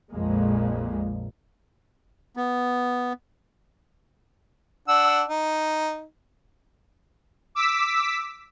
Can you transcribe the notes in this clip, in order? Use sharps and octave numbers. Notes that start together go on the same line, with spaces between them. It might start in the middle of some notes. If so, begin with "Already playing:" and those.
A#1 F2 A#2 G#3 A#3
B3
D4 F#5 E6
D#4
D6 E6 B6